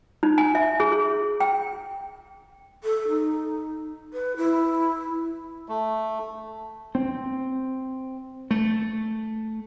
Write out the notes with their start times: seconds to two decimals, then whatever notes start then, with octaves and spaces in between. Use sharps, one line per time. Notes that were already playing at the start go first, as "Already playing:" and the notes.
0.23 D#4
0.38 G#5
0.55 E5
0.80 G#4
0.92 G#4
1.40 G5
2.84 A4
3.08 D#4
4.13 B4
4.37 E4
5.69 A3
6.95 C4
8.51 A3